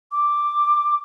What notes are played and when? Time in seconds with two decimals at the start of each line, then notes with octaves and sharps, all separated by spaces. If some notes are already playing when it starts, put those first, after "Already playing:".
0.12 D6